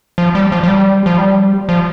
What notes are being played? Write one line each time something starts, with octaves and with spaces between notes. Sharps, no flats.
F3
G3
F3
F3
G3
F3
G3
F3